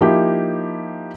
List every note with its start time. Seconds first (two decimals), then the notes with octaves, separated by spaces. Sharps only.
0.01 F3 A#3 D#4 E4 G4